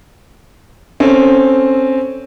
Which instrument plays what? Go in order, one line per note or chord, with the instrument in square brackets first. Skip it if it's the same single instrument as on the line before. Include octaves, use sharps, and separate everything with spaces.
[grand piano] C4 C#4 A4